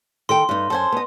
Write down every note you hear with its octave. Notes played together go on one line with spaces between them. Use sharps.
D#3 A4 G5 C6
G2 D#4
F#2 A4 C5 G#5
B3 D#5